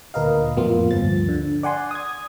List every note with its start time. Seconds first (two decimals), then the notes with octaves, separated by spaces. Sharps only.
0.14 D2 A#2 A#4 B4 D#5 F5
0.56 F2 A2 A#3 B3 F4
0.91 D2 G2 F3 A6
1.28 D3
1.63 D5 F#5 G#5 C6
1.91 D#6 G#6